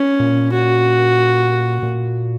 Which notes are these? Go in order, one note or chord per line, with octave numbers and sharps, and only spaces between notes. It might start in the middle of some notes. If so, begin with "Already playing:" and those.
Already playing: C#4
A#2
F#4
A#2